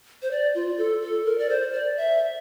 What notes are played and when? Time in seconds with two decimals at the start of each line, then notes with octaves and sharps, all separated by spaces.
0.22 C5
0.31 D5
0.55 F4
0.78 A4
1.02 A4
1.25 A#4
1.38 D5
1.49 C5
1.73 D5
1.97 E5